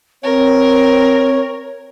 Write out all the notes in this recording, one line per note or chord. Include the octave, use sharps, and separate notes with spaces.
C4 A#4 C#5